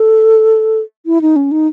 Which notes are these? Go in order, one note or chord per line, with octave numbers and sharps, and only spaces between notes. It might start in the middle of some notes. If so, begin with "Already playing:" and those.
Already playing: A4
E4
D#4
C#4
D#4